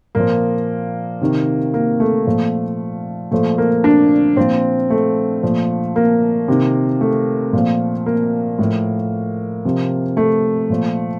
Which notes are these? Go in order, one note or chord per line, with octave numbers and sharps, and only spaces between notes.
A#2 F3 A#3
C3 D#3
A#3
A3
A#2 F3
A#2 F3 A3
A#3
D4
A#2 F3 C4
A3
A#2 F3
A#3
C3 D#3
A3
A#2 F3
A#3
A2 F3
C3 F3
A3
A#2 F3